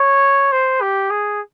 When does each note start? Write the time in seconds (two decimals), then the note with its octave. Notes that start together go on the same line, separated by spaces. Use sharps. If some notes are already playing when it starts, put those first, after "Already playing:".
Already playing: C#5
0.52 C5
0.82 G4
1.10 G#4